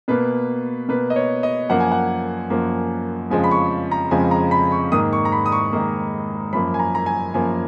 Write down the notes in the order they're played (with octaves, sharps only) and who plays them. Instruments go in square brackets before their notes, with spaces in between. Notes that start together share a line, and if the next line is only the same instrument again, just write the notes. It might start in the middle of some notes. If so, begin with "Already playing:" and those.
[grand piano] B2 A#3 B4
B2 A#3 B4
D#5
C#5
D#5
F#2 F3 A#3 F#5
G#5
F#5
F#2 F3 A#3
F2 C#3 F3 G#3 G#5
B5
C#6
A#5
F2 C#3 F3 G#3 G#5
A#5
B5
C#6
G#2 D#3 A#3 D#6
C#6
A#5
B5
D#6
C#6
G#2 D#3 A#3
F#2 F3 A#3 B5
G#5
A#5
A#5
G#5
F#2 F3 A#3 G#5